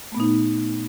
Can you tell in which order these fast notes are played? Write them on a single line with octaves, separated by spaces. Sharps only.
A3 B3 A#2 D#4